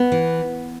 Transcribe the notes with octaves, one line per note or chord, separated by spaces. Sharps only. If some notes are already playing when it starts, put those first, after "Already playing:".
Already playing: B3
E3